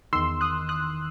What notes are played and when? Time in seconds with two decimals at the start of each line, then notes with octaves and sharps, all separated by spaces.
0.13 E2 D#3 C6 E6
0.41 D#6 F#6
0.69 D#6 F#6